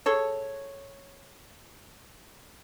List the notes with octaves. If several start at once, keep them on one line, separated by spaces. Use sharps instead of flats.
G#4 A4 C#5